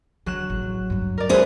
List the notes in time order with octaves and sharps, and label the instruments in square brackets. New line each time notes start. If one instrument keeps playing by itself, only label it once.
[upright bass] D3 [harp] F#3 F#6 E7
[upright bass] A1
D2 G2
[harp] A#4 D5
[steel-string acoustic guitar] D#2 G#4 C5 [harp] B4 E5